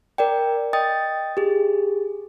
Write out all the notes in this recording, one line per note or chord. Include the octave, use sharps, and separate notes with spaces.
A#4 D5 G5
D#5 G5 D#6 A6
G4 G#4